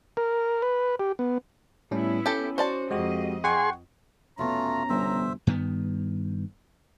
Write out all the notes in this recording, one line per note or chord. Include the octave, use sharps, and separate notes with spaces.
A#4
B4
G4
B3
A2 G3 B3 C#4 E4
C#4 G4 A4
F#4 C5 D5 A5
F2 G#3 F#4 G4 D#5
G#4 F#5 G5 C6 C#6
F1 B2 A3 B3 C#4 F4 A#5
G1 C5 E5
G2 D#3 B3